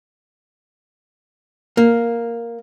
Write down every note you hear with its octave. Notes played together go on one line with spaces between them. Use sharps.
A#3